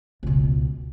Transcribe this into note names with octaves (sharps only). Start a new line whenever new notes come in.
C#2 B2